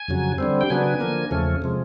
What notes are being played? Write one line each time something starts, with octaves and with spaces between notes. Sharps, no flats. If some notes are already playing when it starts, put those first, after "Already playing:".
Already playing: G#5
F2 C#3 F#3
D3 G3 C4
G5
C#3 F#3 B3 D4 G#5
D3 F3 A#3
E2 C#3 F3 A3 C#4
C3 F3 G#3